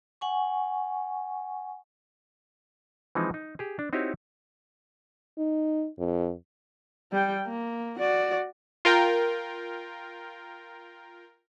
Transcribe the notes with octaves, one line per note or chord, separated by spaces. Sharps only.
F#5 G#5 C#6
E3 F3 G#3 C4 D#4
D#4
G4 G#4
D4
C4 D#4 E4 F#4 G4 C#5
D#4
F2
G3 G5
A#3
F#4 D5
F4 A#4 G5